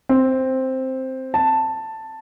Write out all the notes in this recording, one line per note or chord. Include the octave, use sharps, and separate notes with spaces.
C4
A5